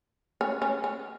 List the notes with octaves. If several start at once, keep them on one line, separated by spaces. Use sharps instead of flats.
C#4
C#4
C#4